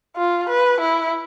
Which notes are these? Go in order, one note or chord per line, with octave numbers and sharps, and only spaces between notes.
F4
B4
E4